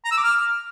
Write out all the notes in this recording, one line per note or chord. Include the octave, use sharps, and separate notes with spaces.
A#5
E6
D6
F6